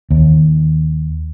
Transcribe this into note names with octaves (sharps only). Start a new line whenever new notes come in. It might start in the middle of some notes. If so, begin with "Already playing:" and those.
D#2